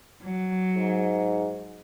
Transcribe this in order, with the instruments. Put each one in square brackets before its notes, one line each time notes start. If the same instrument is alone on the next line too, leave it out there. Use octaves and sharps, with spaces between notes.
[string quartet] F#3
[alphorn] G#2